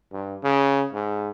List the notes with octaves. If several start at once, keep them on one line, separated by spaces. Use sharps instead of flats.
G2
C#3
G#2